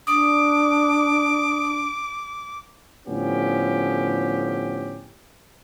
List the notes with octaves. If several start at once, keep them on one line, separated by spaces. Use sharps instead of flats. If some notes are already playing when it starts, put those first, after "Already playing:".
D4 D6 D#6
A2 D3 F3 B3 C#4 G4